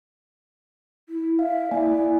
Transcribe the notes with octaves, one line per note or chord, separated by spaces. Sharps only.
E4
E5 F5
A#3 E4 D5 G#5